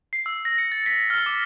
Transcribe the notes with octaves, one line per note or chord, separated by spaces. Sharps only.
C7
E6
A#6
C#7
A6
B6
F6
D6